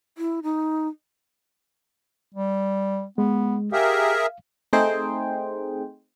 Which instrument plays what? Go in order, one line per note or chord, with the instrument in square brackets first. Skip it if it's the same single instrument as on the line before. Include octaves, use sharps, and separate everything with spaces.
[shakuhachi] E4
D#4
[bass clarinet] G3
[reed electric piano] G#3 [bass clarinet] B3
[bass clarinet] G4 [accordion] G#4 A#4 E5 [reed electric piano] F5
[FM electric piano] A3 C4 D#4 G#4 C5 G5